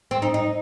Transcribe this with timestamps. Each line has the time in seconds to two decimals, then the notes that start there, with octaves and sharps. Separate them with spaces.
0.11 C4
0.22 D#4
0.34 D#4